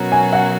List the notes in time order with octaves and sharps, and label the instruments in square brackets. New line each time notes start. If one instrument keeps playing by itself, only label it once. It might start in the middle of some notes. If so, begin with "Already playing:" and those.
Already playing: [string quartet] B2 F#3 C#4 F#4 A#4
[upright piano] G#5
F#5